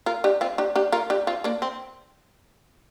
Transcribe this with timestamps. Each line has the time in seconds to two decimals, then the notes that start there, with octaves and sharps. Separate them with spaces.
0.06 F4 A#4
0.24 D4 G4
0.41 C4 F4
0.58 D4 G4
0.76 D4 G4
0.92 F4 A#4
1.10 D4 G4
1.27 C4 F4
1.44 A#3 D4
1.62 C4